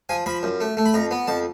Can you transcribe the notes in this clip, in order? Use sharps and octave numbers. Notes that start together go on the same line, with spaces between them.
F3 G#5
F3 B5
F#2
A3
A3
B5
F2 A#5
B3
F2 A5